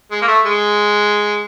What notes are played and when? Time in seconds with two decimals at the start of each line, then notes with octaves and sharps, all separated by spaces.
0.11 G#3
0.22 A#3
0.28 A3
0.46 G#3